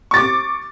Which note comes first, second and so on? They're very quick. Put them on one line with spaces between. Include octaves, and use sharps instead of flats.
C#6 A6 D6